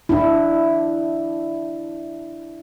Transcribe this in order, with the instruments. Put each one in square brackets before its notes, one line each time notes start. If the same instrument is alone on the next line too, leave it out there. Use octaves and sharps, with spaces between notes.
[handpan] D4 E4